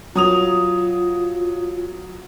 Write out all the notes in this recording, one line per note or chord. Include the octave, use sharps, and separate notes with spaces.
F#3 F4 D#6 F7